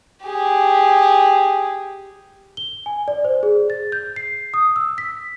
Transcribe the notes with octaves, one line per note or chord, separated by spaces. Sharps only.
G4 G#4
G7
G#5
D5
C5
G#4
A6
G6
C7
D#6
E6
B6